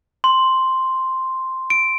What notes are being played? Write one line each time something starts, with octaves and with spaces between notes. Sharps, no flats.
C6
D7